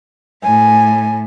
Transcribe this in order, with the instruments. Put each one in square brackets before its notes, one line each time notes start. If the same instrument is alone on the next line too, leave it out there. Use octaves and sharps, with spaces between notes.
[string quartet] A2 [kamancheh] G#5